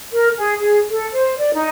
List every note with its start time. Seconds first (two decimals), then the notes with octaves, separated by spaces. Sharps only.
0.13 A#4
0.38 G#4
0.59 G#4
0.89 A4
1.12 C5
1.38 D5
1.54 D#4